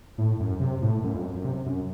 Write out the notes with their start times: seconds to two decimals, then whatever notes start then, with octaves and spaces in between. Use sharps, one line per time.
0.18 A2
0.40 F#2
0.60 C3
0.82 A2
1.03 F#2
1.14 F2
1.23 F#2
1.35 F#2
1.45 C3
1.66 F#2